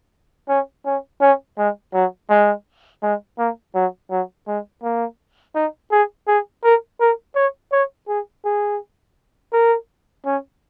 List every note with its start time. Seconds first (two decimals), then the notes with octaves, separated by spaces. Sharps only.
0.48 C#4
0.85 C#4
1.21 C#4
1.58 G#3
1.94 F#3
2.29 G#3
3.03 G#3
3.38 A#3
3.75 F#3
4.10 F#3
4.47 G#3
4.83 A#3
5.55 D#4
5.92 G#4
6.27 G#4
6.64 A#4
7.00 A#4
7.36 C#5
7.72 C#5
8.08 G#4
8.45 G#4
9.53 A#4
10.25 C#4